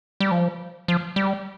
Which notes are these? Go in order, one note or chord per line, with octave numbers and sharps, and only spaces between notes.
G3
F3
F3
G3